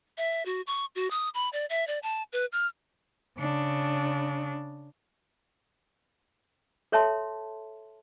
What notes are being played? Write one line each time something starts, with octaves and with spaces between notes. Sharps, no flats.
E5
F#4
C#6
F#4
D#6
B5
D5
E5
D5
A5
B4
F6
C#3 D4
A4 C#5 E5 A5 C6